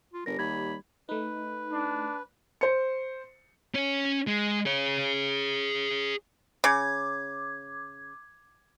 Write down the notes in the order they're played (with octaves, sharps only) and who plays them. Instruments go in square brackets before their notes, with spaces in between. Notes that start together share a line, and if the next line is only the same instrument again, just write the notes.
[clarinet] F4
[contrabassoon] G1 [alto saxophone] G3 [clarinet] A#4 [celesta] A#6
[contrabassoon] D#2 [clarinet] B5 [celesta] G#6
[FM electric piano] A3 D#4 [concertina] B4
[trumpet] D4
[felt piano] C5 C#7
[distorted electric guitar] C#4 C#5
G#3
G#4 C#5
[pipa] C#3 [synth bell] D6 G#6